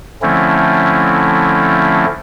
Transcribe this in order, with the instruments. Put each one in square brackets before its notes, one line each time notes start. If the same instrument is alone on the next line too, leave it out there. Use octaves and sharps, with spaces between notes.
[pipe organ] D3 F3 A3 C4 C#4 E4